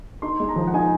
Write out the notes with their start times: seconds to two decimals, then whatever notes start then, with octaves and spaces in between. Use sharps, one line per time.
0.22 D#4 C6
0.40 G#3
0.49 A#5
0.56 F3
0.67 F#5
0.74 D#4 G#5